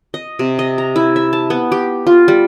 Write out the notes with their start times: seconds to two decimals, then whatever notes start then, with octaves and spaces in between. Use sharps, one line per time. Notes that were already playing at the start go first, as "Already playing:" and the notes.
0.14 D#5
0.39 C3
0.59 D#5
0.78 A#5
0.96 E4
1.16 E5
1.33 A5
1.50 B3
1.72 G4
2.07 F4
2.28 G3